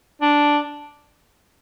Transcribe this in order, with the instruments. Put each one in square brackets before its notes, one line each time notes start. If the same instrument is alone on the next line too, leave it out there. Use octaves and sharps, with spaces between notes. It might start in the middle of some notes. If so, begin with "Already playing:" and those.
[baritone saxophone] D4